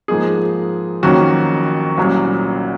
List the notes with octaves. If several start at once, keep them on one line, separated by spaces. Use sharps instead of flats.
G#2 F3 A#3 D#4 G#4
F2 D#3 F#3 A#3 C#4 F#4
C2 A#2 F#3 C#4